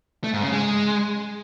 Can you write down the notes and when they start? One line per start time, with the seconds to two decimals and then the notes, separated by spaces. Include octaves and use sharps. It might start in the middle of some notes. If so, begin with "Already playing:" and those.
0.24 A3
0.33 G#2
0.43 C#3
0.52 G#3